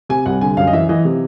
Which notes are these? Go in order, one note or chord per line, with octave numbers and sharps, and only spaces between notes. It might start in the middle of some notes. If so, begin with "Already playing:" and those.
C3 G#5
C2 F#5
D3 G#5
F#2 F5
D#5
E3 E5
E3 D#5
C3